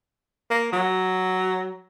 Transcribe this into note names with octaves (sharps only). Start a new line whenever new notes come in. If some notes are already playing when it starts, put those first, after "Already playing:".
A#3
F#3